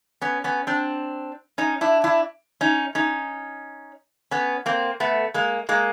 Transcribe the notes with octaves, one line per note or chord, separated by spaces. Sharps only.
B3 C#4
B3 C#4
C4 D4
C#4 D#4
D4 E4
D4 E4
C#4 D#4
C#4 D#4
B3 C#4
A#3 C4
A3 B3
G#3 A#3
G#3 A#3